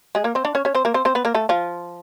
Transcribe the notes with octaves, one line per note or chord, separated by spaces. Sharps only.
G#3 G#4
A#3 A#4
C4 C5
D4 D5
C#4 C#5
C#4 C#5
C4 C5
A#3 A#4
C4 C5
C4 C5
B3 B4
A#3 A#4
A3 A4
F3 F4